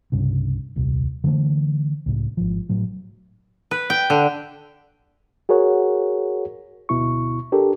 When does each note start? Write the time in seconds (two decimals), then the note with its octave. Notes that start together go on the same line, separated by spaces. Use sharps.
0.12 C2 G2 C#3
0.76 D#1 C2
1.24 D3 E3 G#3 A3
2.06 C#2 A2
2.37 G#1 F3
2.69 A2 F#3
3.71 B4
3.90 G5
4.10 D3
5.49 F#4 G#4 A#4 C#5 F#5
6.89 D2 B2 E4 C#6
7.52 D4 G4 A4 A#4